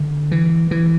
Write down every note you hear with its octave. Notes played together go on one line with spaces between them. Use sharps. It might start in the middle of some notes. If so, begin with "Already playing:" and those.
Already playing: D3
E3
E3